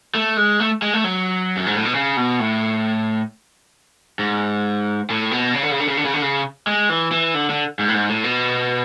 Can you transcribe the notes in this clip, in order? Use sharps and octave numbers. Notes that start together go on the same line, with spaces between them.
A3
G#3
A3
G#3
A3
F#3
F#2
G#2
A2
B2
C#3
B2
A2
G#2
A2
B2
C#3
D3
C#3
D3
C#3
D3
C#3
D3
C#3
G#3
E3
E3
D3
D3
G#2
A2
G#2
A2
B2